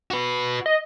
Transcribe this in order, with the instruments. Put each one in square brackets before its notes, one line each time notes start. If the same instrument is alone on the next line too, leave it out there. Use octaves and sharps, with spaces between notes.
[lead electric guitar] F#4 B4
[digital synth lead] D#5